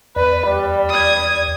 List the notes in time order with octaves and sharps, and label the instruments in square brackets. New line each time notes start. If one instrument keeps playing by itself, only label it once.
[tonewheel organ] E2 D5 [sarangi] B4
[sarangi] G3
[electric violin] D#6 G#6